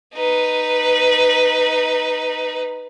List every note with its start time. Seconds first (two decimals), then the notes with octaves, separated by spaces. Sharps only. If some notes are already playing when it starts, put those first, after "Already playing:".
0.15 D#4 B4